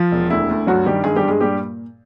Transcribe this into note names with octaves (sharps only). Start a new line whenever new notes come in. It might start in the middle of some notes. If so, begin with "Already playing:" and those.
Already playing: F3 F4
E1
D2 E4
D2
G2 F#3 F#4
D#3 G3 G4
G2 G#3 G#4
G3 G4
G2
G#3 G#4
A#2 G3 G4